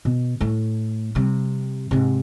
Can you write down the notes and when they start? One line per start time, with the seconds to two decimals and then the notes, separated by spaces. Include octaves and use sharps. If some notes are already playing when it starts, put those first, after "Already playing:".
0.05 B2
0.40 A2 A3
1.15 C3 G3
1.91 G#2 C3